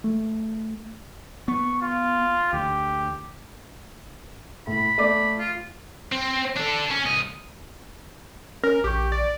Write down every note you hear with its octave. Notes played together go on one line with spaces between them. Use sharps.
A3
B3 C#6
F4
D2 G4
A2 B5
A3 D5 D6
F4
C4
D4 A4
C#4
C2 D#5
C#4 A#4
A#1 G4 C#6
D5